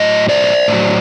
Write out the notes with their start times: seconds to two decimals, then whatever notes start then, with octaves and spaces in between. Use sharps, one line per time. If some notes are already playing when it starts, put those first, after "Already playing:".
Already playing: A2 F#3 D#5
0.29 C5 D5
0.68 A2 F#3